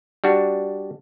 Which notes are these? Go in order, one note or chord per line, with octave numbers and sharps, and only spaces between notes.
G3 D4 F#4